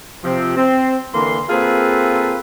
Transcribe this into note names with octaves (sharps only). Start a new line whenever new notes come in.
C3 F3 C4
C4
D3 E3 A#3 C6
A#3 C4 F4 G#4 A4 B4